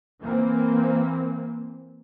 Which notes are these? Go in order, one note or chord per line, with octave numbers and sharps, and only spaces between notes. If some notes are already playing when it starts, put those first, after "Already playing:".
E3 A#3 C4